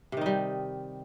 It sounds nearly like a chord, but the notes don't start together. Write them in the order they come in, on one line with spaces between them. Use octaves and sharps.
C3 D#3 D#4 G3